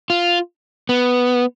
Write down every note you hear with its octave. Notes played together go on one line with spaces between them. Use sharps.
F4
B3